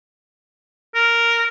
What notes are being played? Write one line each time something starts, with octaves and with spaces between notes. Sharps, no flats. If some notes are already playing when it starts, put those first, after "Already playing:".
A#4